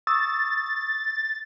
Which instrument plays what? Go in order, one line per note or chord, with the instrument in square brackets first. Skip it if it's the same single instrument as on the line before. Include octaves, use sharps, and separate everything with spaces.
[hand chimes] C#6 D#6 E6 [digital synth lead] A6